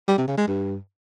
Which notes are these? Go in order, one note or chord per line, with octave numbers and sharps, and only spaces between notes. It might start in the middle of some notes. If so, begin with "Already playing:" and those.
G3
C3
C#3
G#3
G2